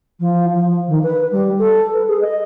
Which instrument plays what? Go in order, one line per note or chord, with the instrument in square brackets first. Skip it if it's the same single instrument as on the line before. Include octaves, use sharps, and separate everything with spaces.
[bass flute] F3
F3
D#3
B4
G3
A4
B4
G#4
D#5